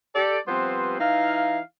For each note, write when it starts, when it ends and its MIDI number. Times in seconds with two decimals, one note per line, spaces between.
0.15 0.38 67
0.15 0.38 69
0.15 0.38 74
0.48 0.96 53
0.48 0.96 55
0.48 0.96 59
0.48 0.96 60
0.48 0.96 71
0.48 0.96 72
1.00 1.60 52
1.00 1.60 63
1.00 1.60 64
1.00 1.60 77